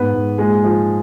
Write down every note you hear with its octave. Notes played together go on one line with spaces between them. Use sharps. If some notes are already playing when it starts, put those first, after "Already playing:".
Already playing: G#2 B3 B4
G#2
A#2 G#3 G#4
F3